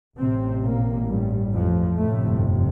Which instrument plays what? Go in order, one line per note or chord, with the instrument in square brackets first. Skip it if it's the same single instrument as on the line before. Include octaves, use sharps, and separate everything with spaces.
[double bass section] A1 A2 C3 C4
A#2 A#3
G2 G3
F2 F3
G1 F2 A2 C3 A3